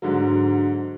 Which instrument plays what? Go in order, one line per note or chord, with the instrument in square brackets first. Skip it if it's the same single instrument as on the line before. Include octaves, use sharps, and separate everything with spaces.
[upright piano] G#2 D3 F#3